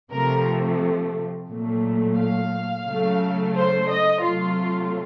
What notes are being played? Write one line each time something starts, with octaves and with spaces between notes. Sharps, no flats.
C3 F3 A3 A#4
A#2 F#3 A3
F5
C#3 F#3 A3
C5
D#5
C3 F#3 A3 F4